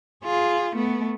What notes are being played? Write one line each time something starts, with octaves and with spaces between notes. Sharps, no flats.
F4 G#4
A3 B3